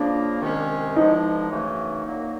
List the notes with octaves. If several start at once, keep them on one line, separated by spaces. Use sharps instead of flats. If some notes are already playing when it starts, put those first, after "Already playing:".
Already playing: C#3 F3 A#3 D4
C2 C3 D#3 G#3 C#4
G2 D3 F3 G#3 D#4
F#2 C#3 E3 A3
C2 A#2 F#3 A#3